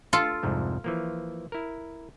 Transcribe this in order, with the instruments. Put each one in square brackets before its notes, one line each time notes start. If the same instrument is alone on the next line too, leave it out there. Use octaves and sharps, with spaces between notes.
[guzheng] F4 A4
[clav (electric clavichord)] C2 F2 G#2
E3 F3 A#3
E4 A#4